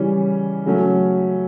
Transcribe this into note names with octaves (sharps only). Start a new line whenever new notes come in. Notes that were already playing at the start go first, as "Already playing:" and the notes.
Already playing: C#3 E3 G3 C#4
C#3 F#3 A3 C#4